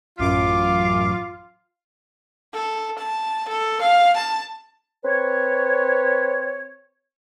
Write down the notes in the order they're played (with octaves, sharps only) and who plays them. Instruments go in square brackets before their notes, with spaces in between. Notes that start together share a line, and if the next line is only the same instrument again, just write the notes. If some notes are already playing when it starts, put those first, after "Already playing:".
[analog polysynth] A1 F#2 D6 [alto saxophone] F4 [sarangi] F5
[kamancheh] A4
A5
A4
F5
A5
[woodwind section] C4 B4 C#5